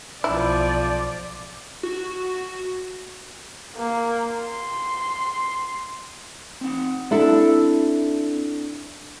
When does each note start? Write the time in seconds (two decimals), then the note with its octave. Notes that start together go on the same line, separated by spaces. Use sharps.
0.24 B1 F3 E4 D5
1.83 F#4
3.76 A#3
4.34 C6
6.61 C4 D#4 F#5
7.11 D4 E4 A4